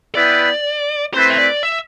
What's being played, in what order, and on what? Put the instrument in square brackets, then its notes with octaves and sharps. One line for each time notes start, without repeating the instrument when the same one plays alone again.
[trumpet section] B3 E4 B4 E5 G5 [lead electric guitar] D5
[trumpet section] A3 C4 E4 B4 [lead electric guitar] C5
[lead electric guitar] E5
D5
E5